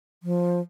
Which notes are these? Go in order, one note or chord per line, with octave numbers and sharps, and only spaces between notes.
F3